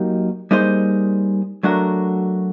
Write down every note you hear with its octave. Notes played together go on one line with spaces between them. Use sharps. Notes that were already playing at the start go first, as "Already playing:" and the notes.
Already playing: F#3 A#3 D#4 G4
G3 A#3 D#4 G#4 C5
F#3 A3 D4 F#4 A#4